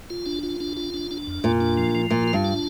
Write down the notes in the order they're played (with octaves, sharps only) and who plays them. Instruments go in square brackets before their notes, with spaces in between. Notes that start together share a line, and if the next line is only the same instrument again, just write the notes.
[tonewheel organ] F4
D4
F4
D4
F4
D4
D4
F2
[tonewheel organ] F2 [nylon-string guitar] A#2
[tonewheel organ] D4
F3
F3
[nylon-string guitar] A#2 [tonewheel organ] F4
[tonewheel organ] F4
[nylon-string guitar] G2
[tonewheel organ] D4